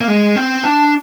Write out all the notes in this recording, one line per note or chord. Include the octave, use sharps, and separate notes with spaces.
A#3
G#3
C4
D4